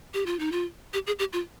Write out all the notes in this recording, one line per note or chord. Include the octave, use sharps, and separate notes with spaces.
G4
F4
D#4
F4
G4
G#4
G4
F4